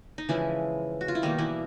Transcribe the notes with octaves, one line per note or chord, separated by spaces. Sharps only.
D#4
C#3 E3 F3 G#3 E4
F#4
F4
E4
B2 D#3 G3 A#3 D#4
E3 E4